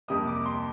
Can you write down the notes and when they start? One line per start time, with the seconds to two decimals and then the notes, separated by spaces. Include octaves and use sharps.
0.08 F2 C3 G3 A#3 D#6
0.27 D6
0.46 C6